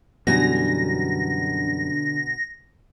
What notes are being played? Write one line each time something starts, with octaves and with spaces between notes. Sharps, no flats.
F#2 B2 D3 E3 G3 G#5 A#5 A#6